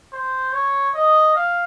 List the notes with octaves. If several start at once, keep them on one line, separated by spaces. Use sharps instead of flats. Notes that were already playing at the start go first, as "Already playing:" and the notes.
C5
C#5
D#5
F5